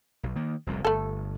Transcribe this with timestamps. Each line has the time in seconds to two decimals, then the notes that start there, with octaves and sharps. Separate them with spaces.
0.23 B1
0.36 D#3 A#3
0.67 F1 C2 A#2
0.85 G1 A3 A4